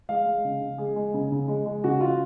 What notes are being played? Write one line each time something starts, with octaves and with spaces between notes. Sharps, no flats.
G#3 F5
G#3
C#3
C#3
G#3 G#4
G#3
C#3
C#3
G#3
G#3
C#3 F#4
C#3 F4